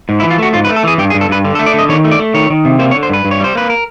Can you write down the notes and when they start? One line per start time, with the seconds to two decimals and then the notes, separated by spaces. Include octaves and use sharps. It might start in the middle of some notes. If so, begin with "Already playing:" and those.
0.09 G#2
0.20 E4
0.23 E3
0.30 F4
0.38 A3 F#4
0.54 G#2 F4
0.65 B4
0.69 A3
0.76 A4
0.84 E3 G#4
0.98 G2 G4
1.10 G#4
1.14 G2
1.21 A4
1.29 G2 B4
1.45 D3
1.55 A4
1.59 A3
1.66 D5
1.74 D3 D#5
1.89 D#3 C#5
2.04 A3
2.11 D5
2.19 A3
2.34 D#3 C#5
2.50 D#3
2.65 C3
2.79 A#3 C5
2.91 C#5
2.95 D3
3.03 C5
3.10 G2 B4
3.25 G2
3.31 C#5
3.41 G3 C5
3.55 A#3 B4
3.70 A#4